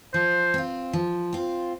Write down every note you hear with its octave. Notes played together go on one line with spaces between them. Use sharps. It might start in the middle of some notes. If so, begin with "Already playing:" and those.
F3 C5
C4 F4
F3
C4 F4